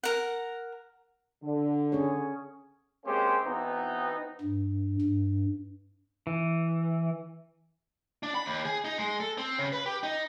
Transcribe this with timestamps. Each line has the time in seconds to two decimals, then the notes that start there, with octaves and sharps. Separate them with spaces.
0.03 A#4 F#5
1.43 D3
1.92 C#4 G#4 C#5
3.05 G#3 A#3 C4 C#4 G4 C5
3.44 B2 E3 B3 C4 D#4
4.41 G2
5.01 G2
6.27 E3
8.23 D4
8.35 B5
8.46 D#2
8.65 G#4
8.85 D#4
8.98 G#3
9.20 A4
9.38 C4
9.58 C#3
9.72 B4
9.86 G4
10.03 D#4